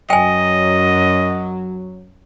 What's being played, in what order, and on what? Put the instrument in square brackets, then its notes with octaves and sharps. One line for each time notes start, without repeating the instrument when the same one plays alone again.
[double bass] F#2 [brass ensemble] F#3 [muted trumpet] D#5 [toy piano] G5 G#5